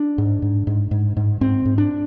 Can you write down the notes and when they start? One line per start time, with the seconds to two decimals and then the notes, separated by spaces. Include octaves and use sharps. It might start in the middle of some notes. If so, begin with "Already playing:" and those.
Already playing: D4
0.18 G#2
0.42 G#2
0.67 G#2
0.91 G#2
1.17 G#2
1.41 G#2 C4
1.65 G#2
1.78 D4